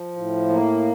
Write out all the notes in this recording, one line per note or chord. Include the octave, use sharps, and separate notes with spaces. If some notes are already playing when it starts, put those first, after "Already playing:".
Already playing: F3
A2
A#3